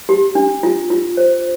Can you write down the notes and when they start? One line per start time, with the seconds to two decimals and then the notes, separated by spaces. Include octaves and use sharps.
0.09 G4
0.35 D4
0.63 F4
0.90 F4
1.17 C5